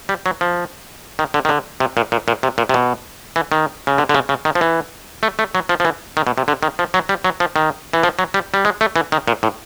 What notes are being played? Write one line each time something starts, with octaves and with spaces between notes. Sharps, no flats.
G3
F#3
F3
D#3
D3
D#3
D3
C3
A#2
A#2
A#2
C3
A#2
C3
B2
E3
D#3
C#3
D3
D3
C#3
C#3
D#3
F3
E3
A3
A3
F#3
F3
F3
E3
D#3
B2
C3
D3
D#3
F3
F#3
G3
F#3
F3
D#3
E3
F3
F#3
G3
G3
G#3
A3
E3
D#3
A#2
A2